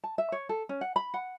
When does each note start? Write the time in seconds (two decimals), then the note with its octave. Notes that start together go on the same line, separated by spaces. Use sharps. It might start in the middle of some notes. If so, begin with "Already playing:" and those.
0.04 A5
0.18 E5
0.32 C#5
0.49 A4
0.69 C#4
0.81 F#5
0.96 B5
1.14 F#5